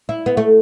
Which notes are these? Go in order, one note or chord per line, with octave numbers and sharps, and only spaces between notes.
E4
B3
A3